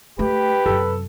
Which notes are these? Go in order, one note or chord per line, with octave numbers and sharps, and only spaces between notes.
A3 G4 B4
F#2 C3 A4